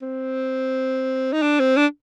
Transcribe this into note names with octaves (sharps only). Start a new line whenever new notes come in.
C4
D#4
D4
C4
D4